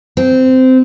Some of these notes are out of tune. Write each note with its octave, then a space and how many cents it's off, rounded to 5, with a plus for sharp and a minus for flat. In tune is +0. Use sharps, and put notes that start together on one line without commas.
C4 -15